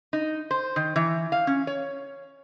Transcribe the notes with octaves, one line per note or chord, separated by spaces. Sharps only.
D#4
C5
D#3
E3
F5
C#4
C#5